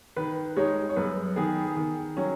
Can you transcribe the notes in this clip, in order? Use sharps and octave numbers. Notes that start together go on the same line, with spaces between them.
D#3 B4
G#3 D#4 C#5
C#5
F#2 B4
D#3 B3 G#4
D#3
F#3 C#4